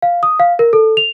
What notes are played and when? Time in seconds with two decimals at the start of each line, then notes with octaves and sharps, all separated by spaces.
0.02 F5
0.23 D#6
0.40 F5
0.59 A#4
0.73 A4
0.97 F7